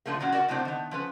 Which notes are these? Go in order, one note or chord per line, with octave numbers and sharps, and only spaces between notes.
A#2 D3 F3 A3 A#3
E2 A#2 F#3 C#4 F#4
F#4 A#4 D5 F#5
A2 C3 F#3 C4 D4
D#3 B3
F3 C#4 B4